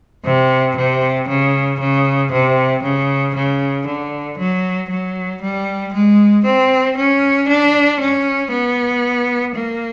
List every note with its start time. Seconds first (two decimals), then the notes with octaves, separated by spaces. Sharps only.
0.25 C3
0.76 C3
1.28 C#3
1.80 C#3
2.32 C3
2.83 C#3
3.35 C#3
3.86 D3
4.38 F#3
4.90 F#3
5.41 G3
5.93 G#3
6.45 C4
6.97 C#4
7.48 D4
8.00 C#4
8.52 B3
9.55 A#3